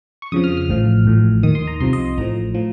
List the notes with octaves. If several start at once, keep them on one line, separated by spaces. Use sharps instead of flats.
C#6
F2 C#3 F3 D#6
F6
F6
A1 A2 F3
A1 A2 F3
D#2 D#3 D#6
C6
A#5
C2 C3 F3 C6
D#5
A1 A2 F3 A#5
A2 F3